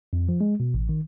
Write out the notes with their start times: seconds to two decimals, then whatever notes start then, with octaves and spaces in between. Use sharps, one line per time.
0.13 F2
0.29 F3
0.41 G#3
0.60 B2
0.74 A1
0.89 D#3